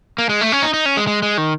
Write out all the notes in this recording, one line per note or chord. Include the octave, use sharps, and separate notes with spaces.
A#3
G#3
A3
C#4
D#4
D#4
C#4
G#3
G#3
G#3
D#3